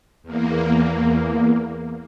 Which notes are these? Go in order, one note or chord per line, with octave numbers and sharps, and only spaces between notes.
E2 A#3